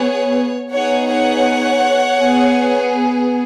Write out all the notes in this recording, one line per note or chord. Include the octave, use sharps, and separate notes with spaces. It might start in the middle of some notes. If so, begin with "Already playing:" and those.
Already playing: B3 G#4 C#5
B3 D#4 G#4 C#5 F#5
C#5 F#5
B3 G#4